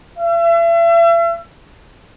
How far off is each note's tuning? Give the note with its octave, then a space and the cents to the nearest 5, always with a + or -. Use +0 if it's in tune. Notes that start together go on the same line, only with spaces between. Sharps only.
E5 +40